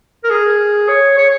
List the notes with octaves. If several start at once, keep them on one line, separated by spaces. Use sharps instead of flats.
A#4
G#4
C#5
C#5